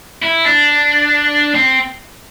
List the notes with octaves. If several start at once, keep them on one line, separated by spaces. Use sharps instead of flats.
E4
D4
C4